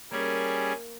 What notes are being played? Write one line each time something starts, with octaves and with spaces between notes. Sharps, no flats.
G3 A#3 C#4 G#4